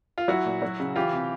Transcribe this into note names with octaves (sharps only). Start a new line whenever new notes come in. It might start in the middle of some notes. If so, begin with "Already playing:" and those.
F4
F#3 E4 F#4
A#2
F#3
C#3
E3 F4 G4
C3